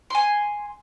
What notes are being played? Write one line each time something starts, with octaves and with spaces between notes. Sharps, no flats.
G#5 C6